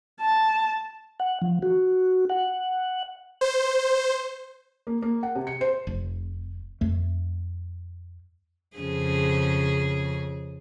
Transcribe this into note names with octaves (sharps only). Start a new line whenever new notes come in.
A5
F#5
F3
F#4
F#5
C5
A#3
A#3
F#5
C3
C#7
C5
F1
F2 A3
F2 C#3 G#4